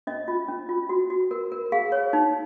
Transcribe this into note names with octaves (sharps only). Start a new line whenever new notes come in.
C#4 D#5
F4
C#4
F4
F#4
F#4
A#4
A#4
G#4 F5
C#5
D#4